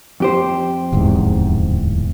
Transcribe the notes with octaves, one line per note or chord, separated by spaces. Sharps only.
F2 G4 C5
D1 E2 G#2